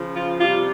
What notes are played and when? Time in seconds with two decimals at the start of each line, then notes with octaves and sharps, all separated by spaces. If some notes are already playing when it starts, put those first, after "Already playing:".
Already playing: C#3 F3
0.16 F4
0.39 C3 G3 F4